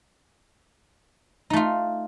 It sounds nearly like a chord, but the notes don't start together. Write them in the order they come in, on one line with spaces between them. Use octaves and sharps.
D#4 A3 F4